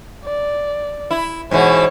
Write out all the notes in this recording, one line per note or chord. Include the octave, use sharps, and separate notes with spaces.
D5
E4
G#2 B2 E3 C#5